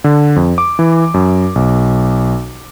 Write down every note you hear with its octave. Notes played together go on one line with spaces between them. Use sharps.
D3
F2
D6
E3
F#2
B1